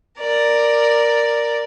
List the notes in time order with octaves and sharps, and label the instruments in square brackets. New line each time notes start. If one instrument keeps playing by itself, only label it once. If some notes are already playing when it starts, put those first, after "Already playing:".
[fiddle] A#4 D5